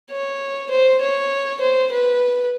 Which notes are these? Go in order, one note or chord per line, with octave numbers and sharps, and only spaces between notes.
C#5
C5
C#5
C5
B4